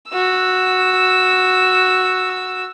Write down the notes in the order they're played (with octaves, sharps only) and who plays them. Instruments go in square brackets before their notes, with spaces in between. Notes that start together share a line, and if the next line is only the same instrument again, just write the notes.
[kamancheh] F#4 E6